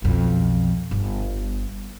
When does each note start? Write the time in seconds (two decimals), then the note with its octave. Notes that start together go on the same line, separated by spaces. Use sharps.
0.02 B1 F2
0.91 G1